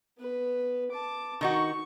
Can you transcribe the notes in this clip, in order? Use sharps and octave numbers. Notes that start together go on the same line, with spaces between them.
B3 B4
A5 D6
D#3 D#4 F#4 C#6